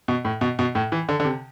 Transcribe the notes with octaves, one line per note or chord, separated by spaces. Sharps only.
B2
A2
B2
B2
A2
E3
D3
D3
C3